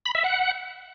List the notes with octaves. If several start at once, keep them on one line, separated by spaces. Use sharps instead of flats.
B5
E5
F#5